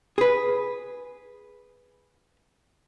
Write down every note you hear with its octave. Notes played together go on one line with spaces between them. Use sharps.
G#4 B4